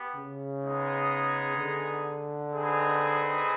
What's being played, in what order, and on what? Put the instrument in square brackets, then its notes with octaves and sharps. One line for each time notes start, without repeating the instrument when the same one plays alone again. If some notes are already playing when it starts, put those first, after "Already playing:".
Already playing: [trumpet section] B3 G4
[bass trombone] C#3
[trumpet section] G#3 B3 D#4 G#4
[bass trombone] D3
[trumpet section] C4 D#4 G#4 B4 D#5